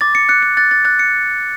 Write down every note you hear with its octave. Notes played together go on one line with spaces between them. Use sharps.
D6 A6
C#7
F#6 C#7
C#7
F#6 A6
A6
F#6 A6
C#7